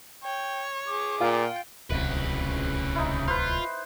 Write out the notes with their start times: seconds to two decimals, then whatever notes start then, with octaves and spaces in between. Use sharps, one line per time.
0.24 C#5 G5
0.88 G#4 D6
1.21 A#2 F4 G5
1.90 D1 C2 C#3 B4
2.95 D#4 E4
3.28 F4 B4 C5